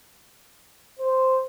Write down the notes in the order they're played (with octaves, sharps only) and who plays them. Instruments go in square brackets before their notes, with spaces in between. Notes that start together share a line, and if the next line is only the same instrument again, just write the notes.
[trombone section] C5